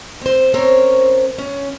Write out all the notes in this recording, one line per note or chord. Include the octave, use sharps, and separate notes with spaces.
C4 C5
C4 C#4 A#4 C5 C#5
C#4